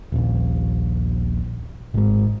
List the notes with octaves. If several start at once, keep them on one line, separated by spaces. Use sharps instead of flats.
D#1 A#1
G#1 G#2